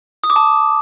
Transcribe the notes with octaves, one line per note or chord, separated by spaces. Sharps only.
D#6
D6
A5